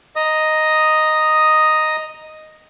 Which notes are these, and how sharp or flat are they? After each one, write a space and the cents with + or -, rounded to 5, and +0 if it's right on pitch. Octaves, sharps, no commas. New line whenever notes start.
D#5 +0 A#5 +0 D#6 +0